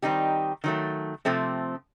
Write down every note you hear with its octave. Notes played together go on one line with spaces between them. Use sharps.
D#3 G3 C4 D#4 G4
D#3 F#3 A3
C3 F3 A3 C4